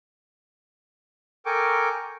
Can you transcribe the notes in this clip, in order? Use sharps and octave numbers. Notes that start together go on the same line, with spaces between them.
A4 A#4 G5 G#5 C#6 D6